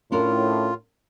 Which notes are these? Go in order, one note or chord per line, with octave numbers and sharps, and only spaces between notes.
A2 C#4 D4 F4 A#4